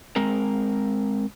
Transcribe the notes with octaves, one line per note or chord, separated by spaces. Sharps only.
G#3 C4 A#4